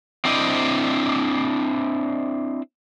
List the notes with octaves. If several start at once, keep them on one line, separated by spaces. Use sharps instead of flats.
C4 D4 E4 C5 D5 D#5